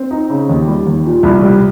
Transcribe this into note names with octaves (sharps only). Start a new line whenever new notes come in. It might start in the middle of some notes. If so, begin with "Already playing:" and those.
Already playing: C4
D#4
C#3
D#2
G3
D#2
A#2
C2
G3